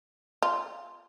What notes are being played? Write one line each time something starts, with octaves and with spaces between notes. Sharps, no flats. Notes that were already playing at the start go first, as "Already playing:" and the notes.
F4